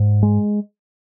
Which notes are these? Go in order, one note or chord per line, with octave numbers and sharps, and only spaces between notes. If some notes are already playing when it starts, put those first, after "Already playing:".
Already playing: G#2
G#3